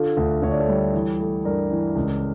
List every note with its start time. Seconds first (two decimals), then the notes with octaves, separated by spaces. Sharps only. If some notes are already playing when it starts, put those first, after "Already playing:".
Already playing: D3 F4 A4
0.17 D2
0.42 D2 C#5
0.52 D5
0.60 A4 C#5
0.69 G3
0.93 E3
1.19 A3
1.45 G2 A#4 D5
1.71 E3
1.95 C#2